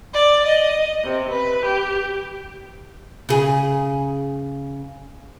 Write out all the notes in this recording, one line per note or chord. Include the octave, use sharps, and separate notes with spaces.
D5
D#5
C3
B4
G4
C#3 G#4